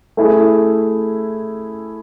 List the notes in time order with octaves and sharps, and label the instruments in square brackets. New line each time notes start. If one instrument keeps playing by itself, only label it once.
[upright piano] A3 E4 G#4